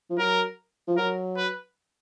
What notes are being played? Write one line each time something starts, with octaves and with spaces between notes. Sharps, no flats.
F3
F#3 A#4
F3
F#3 A#4
B4